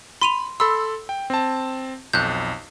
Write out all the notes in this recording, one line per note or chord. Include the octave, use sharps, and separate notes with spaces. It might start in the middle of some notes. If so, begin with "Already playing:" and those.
B5 C6 D#7 F7
A4 B5 C6 E6
G5
C4 A5
B1 F2 F#6 G6